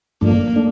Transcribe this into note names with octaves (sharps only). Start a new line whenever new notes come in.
G2 F3 A3 A#3 D4
A3 D4